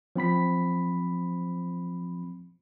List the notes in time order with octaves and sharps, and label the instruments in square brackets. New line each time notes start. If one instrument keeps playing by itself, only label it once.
[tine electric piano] F3 C4 B5 B6